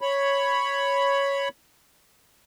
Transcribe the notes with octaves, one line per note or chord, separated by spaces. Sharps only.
C#5 B5